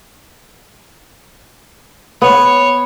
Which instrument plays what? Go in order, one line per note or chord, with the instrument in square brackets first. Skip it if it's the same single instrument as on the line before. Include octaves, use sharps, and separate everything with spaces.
[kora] B3 [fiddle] C#5